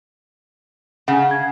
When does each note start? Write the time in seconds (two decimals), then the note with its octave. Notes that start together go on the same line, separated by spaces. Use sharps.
1.08 C#3 F#5 G#5
1.31 G#6